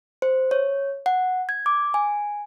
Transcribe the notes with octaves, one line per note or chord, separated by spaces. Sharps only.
C5
C#5
F#5
G#6
D6
G#5